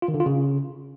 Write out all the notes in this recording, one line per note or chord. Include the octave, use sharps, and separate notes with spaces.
F4
D#3
D3
F4
C#3